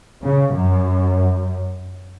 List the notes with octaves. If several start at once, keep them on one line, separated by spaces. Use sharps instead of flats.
C#3
F#2